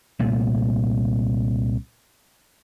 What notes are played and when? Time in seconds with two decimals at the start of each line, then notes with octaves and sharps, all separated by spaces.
0.19 C2 A#2 A3